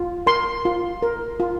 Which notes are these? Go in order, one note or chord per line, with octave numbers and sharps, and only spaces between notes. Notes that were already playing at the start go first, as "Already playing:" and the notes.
Already playing: F4
A#4 C6
F4
A#4
F4